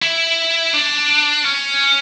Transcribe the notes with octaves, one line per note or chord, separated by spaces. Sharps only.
E4
D4
C#4